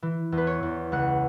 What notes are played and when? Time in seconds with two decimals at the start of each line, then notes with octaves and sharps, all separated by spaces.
0.02 E3
0.32 E2
0.38 B4
0.47 C#5
0.63 E2
0.92 C#2 F#5